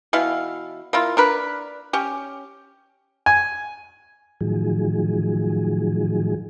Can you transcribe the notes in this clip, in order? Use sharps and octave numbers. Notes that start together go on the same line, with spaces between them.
B2 E3 E4 F5
A#3 E4 F4
D4 A#4 B4
C#4 G4
G#5
A2 D#3 F3 F#3 G#4